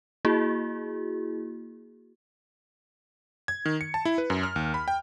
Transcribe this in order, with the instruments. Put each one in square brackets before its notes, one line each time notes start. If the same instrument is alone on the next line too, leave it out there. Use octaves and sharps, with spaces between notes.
[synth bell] A#3 E4 F#4 G#4
[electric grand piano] G#6
D#3
C#7
A5
E4
B4
F#2
F6
D#2
B5
G5